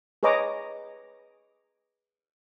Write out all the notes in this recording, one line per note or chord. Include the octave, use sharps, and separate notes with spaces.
G#4 B4 C#5 D#5 A#5 D6